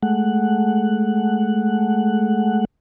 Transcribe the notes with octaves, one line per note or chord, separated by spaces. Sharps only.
G#3 A3 F#5